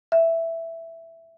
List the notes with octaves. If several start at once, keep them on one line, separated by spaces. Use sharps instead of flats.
E5